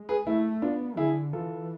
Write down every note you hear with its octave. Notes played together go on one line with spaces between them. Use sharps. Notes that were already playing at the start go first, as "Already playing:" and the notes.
Already playing: G#3
G#4 B4
A3 E4
B3 D4 F4
D3 E4 G#4
E3 F4 A4